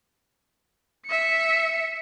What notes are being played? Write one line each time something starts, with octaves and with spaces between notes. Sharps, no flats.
E5 C#7